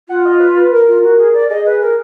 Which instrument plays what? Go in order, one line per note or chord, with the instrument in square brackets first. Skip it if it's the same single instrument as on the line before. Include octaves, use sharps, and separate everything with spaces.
[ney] F4 [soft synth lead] F#5
[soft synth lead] D#5
B4
B4
A#4
[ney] F4
F#4
G#4
D5
[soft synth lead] G#4 [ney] D#5
[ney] B4
A#4